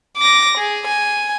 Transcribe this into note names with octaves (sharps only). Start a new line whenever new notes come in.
D6 A#6
G#4
G#5